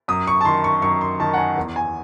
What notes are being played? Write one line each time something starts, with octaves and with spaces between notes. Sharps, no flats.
F#2 D#6
C#6
A5
D#3 C6
C#6
F#2 C#6
C6
D#3 A5
F#5
G#5
E2
G#5